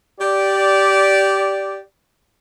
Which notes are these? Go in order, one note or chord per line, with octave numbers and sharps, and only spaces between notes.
G4 D5